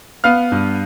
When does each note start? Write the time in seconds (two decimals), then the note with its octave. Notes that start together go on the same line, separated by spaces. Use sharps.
0.24 B3 F5 F6
0.52 G2